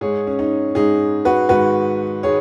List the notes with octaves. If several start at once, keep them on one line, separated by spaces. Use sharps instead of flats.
G#2 G#3 G#4 C#5
C#4
D#4
G#2 G#3 D#4 G#4
F#4 B4
G#2 D#3 G#3 F#4 B4
D#3 G#3 G#4 C#5